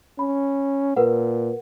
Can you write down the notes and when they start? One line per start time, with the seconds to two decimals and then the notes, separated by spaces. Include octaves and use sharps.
0.19 C#4 B5
0.96 A#2 A#4 B4 F#5